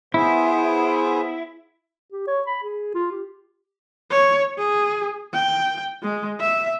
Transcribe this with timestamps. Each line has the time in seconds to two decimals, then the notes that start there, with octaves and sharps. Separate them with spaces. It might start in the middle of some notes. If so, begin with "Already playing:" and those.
0.14 B3 E4 G#4 C5
2.13 G4
2.27 C#5
2.47 B5
2.63 G#4
2.95 F4
3.11 G4
4.11 C#5
4.58 G#4
5.33 G5
6.02 G#3
6.40 E5